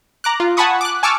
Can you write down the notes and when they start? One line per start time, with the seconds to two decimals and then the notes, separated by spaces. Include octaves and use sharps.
0.24 A#5 D6 F#6
0.40 F4
0.57 F#5 G#5 A5 B5 C#6 D#6
0.81 D6 F#6
1.03 G#5 A5 C#6 D6 E6 F6